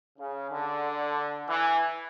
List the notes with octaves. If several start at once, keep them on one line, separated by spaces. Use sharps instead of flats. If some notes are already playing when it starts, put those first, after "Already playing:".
C#3
D3
E3